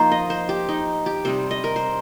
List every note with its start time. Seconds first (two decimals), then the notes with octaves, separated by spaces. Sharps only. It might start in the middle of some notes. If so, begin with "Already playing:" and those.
Already playing: F3 A#3 D#4 C5
0.12 D#5
0.30 C5
0.49 G4
0.69 D#4
1.06 G4
1.25 C3 G3 D#4 C5
1.51 D#5
1.64 A#4
1.76 C5